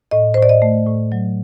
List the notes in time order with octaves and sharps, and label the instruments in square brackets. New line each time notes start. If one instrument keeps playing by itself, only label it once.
[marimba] A2 D#5
C5
A2
D5
D#5
A3
A2
F#3